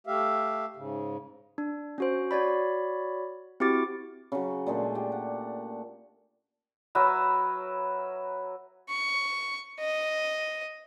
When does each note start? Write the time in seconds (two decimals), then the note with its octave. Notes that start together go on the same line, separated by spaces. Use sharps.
0.07 A3 G4 E5 F5
0.76 G#2 C#3
1.58 D4
1.98 C#4 F#4 C5
2.31 F#4 C#5 D5 B5
3.60 C4 E4 F#4 G4 D6 A6
4.32 C#3 F#3
4.67 A#2 G#3 A3 D4
4.95 G4
5.12 F#5
6.95 F#3 A#4 B4 E5
8.89 C#6
9.81 D#5